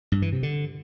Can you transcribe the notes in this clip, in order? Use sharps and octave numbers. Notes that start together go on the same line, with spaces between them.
G2
E3
C3
D3